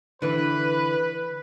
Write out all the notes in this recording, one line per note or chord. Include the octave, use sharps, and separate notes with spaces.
D3 E3 B4